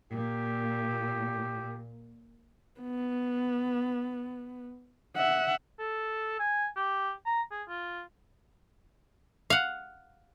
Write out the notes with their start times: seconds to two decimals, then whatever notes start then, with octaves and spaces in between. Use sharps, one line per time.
0.12 A#2 G4
2.81 B3
5.17 E5 F#5
5.79 A4
6.39 G#5
6.76 G4
7.26 A#5
7.51 G#4
7.68 F4
9.50 F5 F#5